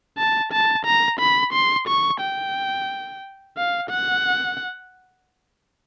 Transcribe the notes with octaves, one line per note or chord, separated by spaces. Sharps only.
A5
A5
A#5
B5
C6
C#6
G5
F5
F#5